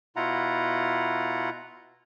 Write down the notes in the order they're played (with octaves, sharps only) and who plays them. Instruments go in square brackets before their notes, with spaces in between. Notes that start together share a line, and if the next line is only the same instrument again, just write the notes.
[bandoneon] B2 E4 F4 F#5 A#5